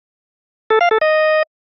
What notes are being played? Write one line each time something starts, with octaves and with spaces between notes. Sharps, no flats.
A4
F5
A4
D#5